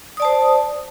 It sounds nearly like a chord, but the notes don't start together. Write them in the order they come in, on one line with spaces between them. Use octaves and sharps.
D#6 D5 A5 C5